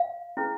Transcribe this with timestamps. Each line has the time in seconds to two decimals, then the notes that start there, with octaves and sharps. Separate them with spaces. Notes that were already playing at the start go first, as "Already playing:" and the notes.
Already playing: F5
0.37 C#4 E4 G#4 B4